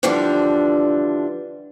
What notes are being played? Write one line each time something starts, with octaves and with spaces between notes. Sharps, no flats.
D3 E3 F3 G3 D4